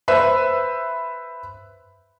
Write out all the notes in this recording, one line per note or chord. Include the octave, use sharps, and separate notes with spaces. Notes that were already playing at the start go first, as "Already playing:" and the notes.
B4 C5 E5